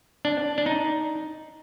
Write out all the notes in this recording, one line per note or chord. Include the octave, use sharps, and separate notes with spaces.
D4
D4
D#4